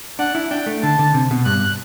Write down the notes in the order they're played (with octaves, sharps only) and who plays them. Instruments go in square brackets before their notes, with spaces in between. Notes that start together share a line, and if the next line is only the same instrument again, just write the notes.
[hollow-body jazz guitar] D4 [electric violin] F#5
[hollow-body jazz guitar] E4
[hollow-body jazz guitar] D4 [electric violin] G5
[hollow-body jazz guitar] A3
[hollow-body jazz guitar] D3 [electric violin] A5
[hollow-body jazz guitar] D3
C3
B2
[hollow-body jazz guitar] G2 [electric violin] F#6